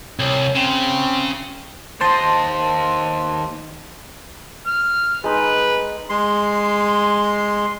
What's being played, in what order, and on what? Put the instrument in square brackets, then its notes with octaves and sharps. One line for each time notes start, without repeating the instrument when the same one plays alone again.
[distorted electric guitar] C2 [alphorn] C#5
[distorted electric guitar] C#3 [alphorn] C4
[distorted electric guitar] D#2 D#5 [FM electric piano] C5 A5 C6
[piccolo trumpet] F6
[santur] G#3 D#4 [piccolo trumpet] B4
[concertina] G#3 C6